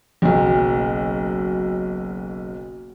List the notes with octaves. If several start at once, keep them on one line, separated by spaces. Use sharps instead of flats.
F#1 B1